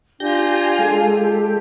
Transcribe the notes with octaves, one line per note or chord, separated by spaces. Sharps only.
D4 F4 G4 G#5 G6 A#6
G#3 A4
F4 G4